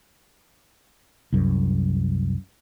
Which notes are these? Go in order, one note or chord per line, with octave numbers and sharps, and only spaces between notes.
C2 F#2